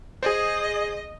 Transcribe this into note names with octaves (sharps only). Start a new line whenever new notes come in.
G#4 C5 D#5